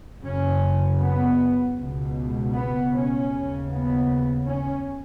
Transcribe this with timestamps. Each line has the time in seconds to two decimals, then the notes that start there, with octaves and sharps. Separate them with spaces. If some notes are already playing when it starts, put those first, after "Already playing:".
0.24 F#1 F#2 C#3 C#4
1.00 B3
1.77 C#2 B2
2.54 B3
2.93 C#4
3.31 D#2 C#3
3.69 B3
4.46 C#4